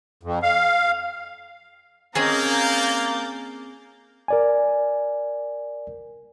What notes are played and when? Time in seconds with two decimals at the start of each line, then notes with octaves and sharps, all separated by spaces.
0.23 F2
0.43 F5
2.15 A#3 C4 C#4 G#4 D#5 A#5 G6 A6
4.28 A#4 D5 G#5